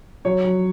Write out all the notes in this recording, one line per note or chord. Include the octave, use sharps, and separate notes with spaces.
F#3 C#5
F#3